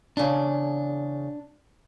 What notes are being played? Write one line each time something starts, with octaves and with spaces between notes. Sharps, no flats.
E2 C#3 D4